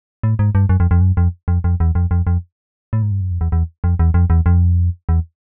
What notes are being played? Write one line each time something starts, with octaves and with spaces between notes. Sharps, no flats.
A2
G#2
G2
F#2
F2
F2
F#2
F2
F2
F2
E2
F2
F2
F2
A2
G#2
G2
F#2
F2
E2
E2
F2
E2
F2
E2
F2
E2